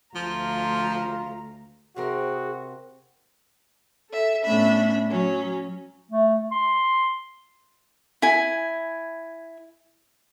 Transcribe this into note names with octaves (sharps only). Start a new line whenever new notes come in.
D2 F3 F4 A#5
C3 C4 F#4 G#4 A#4
A4 E5
A2 B3 C#4 D4 E5 B5
F#3 C#4
A3
C6
E4 G#5